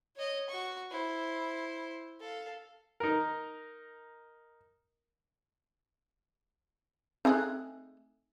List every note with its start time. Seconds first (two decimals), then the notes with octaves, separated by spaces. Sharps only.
0.16 C#5 D#5
0.50 F#4 C#6
0.91 E4 C5
2.20 A4 F5
3.00 D#4 A#4
7.25 A3 C4 D#4 G#4 F#6